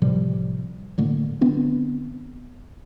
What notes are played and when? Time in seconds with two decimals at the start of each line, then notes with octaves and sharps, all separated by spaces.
0.02 A2 C3 F3 G3
0.98 A2 D3 A3 A#3
1.41 D3 B3 C4 D4